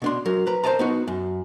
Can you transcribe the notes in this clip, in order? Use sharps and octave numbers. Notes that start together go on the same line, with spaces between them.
B2 D4 C6
F#3 A#4
B4 A#5
A#4 C5 D5 D#5 A5 A#5
B3 D#4 F#4
F#2